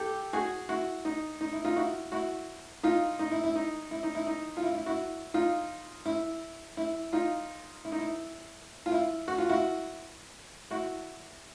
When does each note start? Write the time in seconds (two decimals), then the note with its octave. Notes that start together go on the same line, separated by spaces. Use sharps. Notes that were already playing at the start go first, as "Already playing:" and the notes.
Already playing: G4 A4
0.33 F#4 G#4
0.69 E4 F#4
1.05 D#4
1.41 D#4
1.53 E4
1.64 D#4 F4
1.76 E4 F#4
2.12 E4 F#4
2.83 D#4 F4
3.19 D#4
3.31 E4
3.44 E4
3.56 D#4
3.91 E4
4.03 D#4
4.15 E4
4.27 D#4
4.57 F4
4.63 E4
4.75 E4
4.86 E4 F#4
5.34 D#4 F4
6.05 E4
6.77 E4
7.13 D#4 F4
7.85 E4
7.92 D#4
7.99 E4
8.86 F4
8.92 E4
9.28 F#4
9.38 F4
9.49 E4 F#4
10.71 E4 F#4